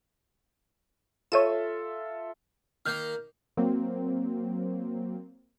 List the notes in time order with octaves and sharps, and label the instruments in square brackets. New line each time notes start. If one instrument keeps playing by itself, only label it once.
[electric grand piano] F4 A4 E5 [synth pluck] C#5 D#7 E7
[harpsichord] D#3 A#3 [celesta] F6 G6
[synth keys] F#3 A#3 C4